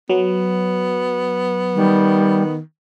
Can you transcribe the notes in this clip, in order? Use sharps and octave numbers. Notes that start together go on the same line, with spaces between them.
F#3 B3
D#3 G3